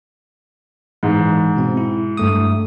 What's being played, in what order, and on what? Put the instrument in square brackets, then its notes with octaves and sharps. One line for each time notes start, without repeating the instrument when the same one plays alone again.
[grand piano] G#2 [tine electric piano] E3
[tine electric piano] B2 C4
E4
G2 A3 D#6